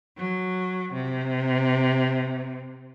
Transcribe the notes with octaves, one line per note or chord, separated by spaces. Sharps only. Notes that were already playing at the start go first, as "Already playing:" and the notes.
F#3
C3